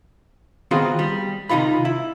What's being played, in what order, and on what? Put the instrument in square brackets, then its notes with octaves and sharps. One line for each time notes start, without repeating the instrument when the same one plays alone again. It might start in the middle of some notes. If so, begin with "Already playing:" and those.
[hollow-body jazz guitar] D#3 B3 C4 F4 F#4 G#4
G3
C3 D#3 D#4 F4 B5
E4